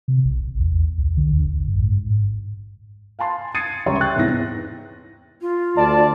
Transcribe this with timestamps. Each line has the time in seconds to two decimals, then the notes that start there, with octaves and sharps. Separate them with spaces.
0.08 C3
0.25 A#1
0.41 A1
0.59 E2
0.98 C2
1.17 D3
1.33 D#2
1.44 A1
1.68 G2
1.82 G#2
3.19 F5 G#5 A5 C6
3.54 D#6 G#6 A6 C7 C#7 D#7
3.86 C#2 G3 C#5 E5 A#5 C6
4.00 E5 G5 C#6 F#6 A6
4.15 E2 G#2 C3 B3 E4 A#6
5.41 F4
5.77 D2 D5 A5